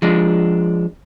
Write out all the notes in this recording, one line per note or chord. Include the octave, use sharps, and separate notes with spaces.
F3 G#3 D4